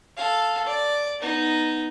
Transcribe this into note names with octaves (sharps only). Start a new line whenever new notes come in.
A4 F5
D5
B3 D#4